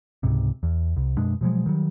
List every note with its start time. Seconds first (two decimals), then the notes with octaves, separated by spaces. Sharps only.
0.23 C#2 G#2 C3
0.63 E2
0.96 C2
1.17 F#2 B2 G#3 D4
1.41 B2 F3 F#3 G#3
1.66 D#3 F#3 G3